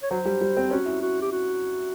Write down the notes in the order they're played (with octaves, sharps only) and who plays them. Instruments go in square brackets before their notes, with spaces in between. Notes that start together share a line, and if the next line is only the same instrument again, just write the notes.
[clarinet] C#5
[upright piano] F#3 [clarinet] C5
[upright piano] G3
G3
C4
[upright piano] C#4 [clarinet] F#4
[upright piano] E4
[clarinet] F#4
G4
F#4